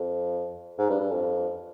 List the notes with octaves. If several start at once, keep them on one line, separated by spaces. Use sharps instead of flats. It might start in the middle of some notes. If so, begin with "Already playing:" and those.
Already playing: F2
G#2
G2
G2
F2